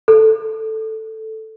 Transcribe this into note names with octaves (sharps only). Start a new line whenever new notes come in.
A4